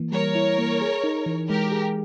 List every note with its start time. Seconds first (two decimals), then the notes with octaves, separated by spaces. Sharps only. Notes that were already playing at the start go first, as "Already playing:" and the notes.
Already playing: E3 A#3
0.12 G3 A#4 C#5
0.35 E4
0.58 A#3
0.81 G#4
1.04 D#4
1.26 E3
1.49 G#3 G4 A#4
1.72 G#4